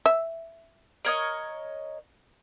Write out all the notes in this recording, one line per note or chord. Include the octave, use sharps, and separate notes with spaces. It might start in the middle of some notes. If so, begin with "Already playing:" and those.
E5
A#4 C#5 D#5